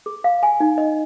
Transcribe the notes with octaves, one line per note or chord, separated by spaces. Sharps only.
G#4
F5
G#5
D#4
D#5